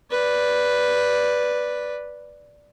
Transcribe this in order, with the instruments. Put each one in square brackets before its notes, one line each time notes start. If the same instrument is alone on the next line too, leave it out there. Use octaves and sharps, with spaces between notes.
[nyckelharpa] B4 D5